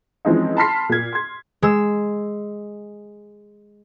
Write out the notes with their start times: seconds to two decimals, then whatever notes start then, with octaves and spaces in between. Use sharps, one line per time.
0.25 E3 F3 G#3 C4 C#4 D#4
0.57 A5 B5 C6 F6 B6 C7
0.89 A#2 G#6
1.13 C6 G#6
1.62 G#3 E6